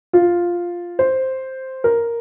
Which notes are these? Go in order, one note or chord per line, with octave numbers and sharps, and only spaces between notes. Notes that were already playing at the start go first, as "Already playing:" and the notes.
F4
C5
A#4